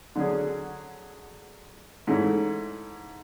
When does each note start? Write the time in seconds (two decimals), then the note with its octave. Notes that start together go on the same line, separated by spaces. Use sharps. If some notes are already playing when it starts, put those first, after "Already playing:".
0.15 D3 F#3 C#4 G#4
2.07 G#2 E3 A3 C#4